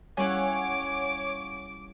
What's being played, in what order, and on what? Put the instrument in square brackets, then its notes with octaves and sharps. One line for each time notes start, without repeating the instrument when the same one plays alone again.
[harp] G3 C#4 E4 [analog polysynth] C#5 [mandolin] F5 F#5 G#5 [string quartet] D6